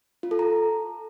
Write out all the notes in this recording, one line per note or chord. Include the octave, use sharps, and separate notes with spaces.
F4
A4
A#5